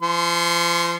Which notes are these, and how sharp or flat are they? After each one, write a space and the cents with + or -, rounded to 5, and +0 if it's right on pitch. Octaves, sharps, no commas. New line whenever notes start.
F3 -35 C6 +0